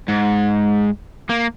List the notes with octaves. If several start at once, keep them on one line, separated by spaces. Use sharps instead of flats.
G#2
A#3